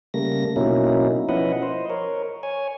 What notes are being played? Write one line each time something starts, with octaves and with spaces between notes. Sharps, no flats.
C#3 G3 A3 A#3 A#6
B2 F#3 A#3 C#4 D#4 E4
F3 C#4 E4 B4 D#5 F#5
C5 D#5
A#4 C#5
C#5 G#5